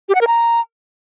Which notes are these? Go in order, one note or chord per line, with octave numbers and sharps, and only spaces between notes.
G4
F#5
A#4
A#5